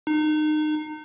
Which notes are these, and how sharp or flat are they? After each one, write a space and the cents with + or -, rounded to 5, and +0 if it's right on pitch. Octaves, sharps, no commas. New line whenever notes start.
D#4 -30